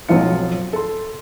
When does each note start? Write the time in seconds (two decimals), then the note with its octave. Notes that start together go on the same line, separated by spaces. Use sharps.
0.09 B1 F3 F#3 C4 F4 C#7
0.73 A4 C6